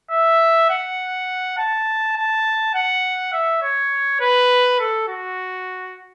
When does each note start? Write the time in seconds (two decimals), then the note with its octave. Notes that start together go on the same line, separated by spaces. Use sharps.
0.11 E5
0.70 F#5
1.58 A5
2.16 A5
2.74 F#5
3.33 E5
3.62 C#5
4.20 B4
4.80 A4
5.08 F#4